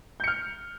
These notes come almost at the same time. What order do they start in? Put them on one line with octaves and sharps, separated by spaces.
G6 C#7 F6